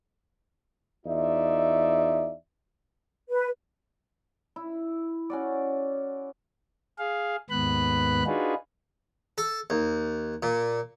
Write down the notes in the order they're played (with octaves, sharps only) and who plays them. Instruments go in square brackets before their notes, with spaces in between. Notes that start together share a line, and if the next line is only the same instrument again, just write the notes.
[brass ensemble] E2 D#4 F4 D5 E5
[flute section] B4
[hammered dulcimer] E4
C#4 F#4 D5
[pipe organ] G#4 F5
D#2 G#2 B3 B4 B5 F#6
D4 D#4 F4 F#4 G#4 B4
[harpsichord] A4
D#2
A#2